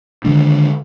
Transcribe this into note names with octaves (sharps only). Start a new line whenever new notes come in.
D3 D#3 G#3 D4